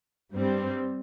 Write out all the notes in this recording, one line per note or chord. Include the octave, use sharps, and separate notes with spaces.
G2 G3 C4